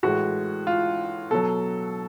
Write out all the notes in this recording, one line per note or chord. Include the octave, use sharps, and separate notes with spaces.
A2 E3 G#3 F#4
F4
B2 F#3 A4